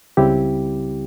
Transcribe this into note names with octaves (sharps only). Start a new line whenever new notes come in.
C#2 C#3 G3 C4 E4 G4